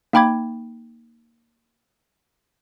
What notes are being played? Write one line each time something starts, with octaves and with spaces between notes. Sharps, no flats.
A#3 D#4 G5 B5 D6 G#6